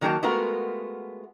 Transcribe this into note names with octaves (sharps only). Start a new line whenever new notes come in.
D#3 F#3 A#3 F#4 G5 A5
G#3 A3 B3 F4 F#4 A#4